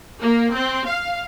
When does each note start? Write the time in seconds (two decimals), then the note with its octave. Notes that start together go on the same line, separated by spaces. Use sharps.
0.20 A#3
0.53 C4
0.86 F5